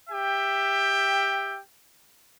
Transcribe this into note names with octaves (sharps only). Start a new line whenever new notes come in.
G4 E5 G5